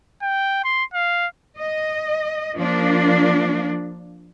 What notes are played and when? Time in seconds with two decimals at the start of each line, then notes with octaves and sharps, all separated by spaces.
0.22 G5
0.64 C6
0.94 F5
1.59 D#5
2.55 F3 A#3 D4